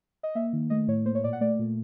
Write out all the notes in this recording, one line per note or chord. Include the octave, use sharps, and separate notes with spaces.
D#5
A#3 E5
D#3
A3 D#5
A2 C#5
A#3 C5
C#5
A#2 D5
F#5
A3 D5
A#2